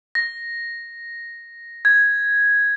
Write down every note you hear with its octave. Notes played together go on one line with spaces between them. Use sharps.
A#6
G#6